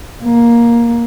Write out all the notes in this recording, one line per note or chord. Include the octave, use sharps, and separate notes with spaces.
A#3